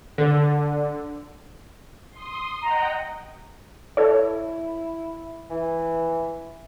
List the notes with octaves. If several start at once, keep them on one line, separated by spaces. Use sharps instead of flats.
D3
C6 D#6
D#5 F#5 G5 A#5
E4 A4 C#5
E3